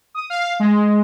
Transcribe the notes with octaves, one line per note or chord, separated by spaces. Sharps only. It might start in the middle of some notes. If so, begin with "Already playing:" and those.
D#6
F5
G#3